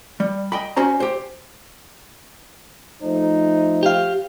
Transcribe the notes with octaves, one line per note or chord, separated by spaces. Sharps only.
G3
D#5 G5 B5
C#4 F#4 C5 A#5
G4 C5
F3 A3 D#4 C5
G4 F5